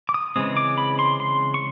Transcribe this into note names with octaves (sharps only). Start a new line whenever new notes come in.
D6
D#6
C#3 E3 G#3 C4 D#6
D6
B5
C6
C6
C#6